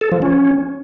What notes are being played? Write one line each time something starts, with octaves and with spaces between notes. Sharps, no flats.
A4
F3
C#4